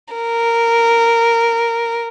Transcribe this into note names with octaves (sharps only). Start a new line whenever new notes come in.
A#4